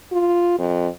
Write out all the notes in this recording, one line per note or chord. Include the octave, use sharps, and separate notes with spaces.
F4
F2